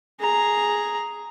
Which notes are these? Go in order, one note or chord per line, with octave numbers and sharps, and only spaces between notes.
G#4 A#5